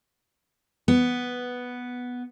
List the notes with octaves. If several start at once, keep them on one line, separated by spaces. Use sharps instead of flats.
B3